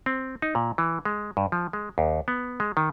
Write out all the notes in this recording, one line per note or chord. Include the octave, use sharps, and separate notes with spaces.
C4
D#4
A#2
E3
G#3
G2
F3
G#3
D#2
B3
G#3
D#3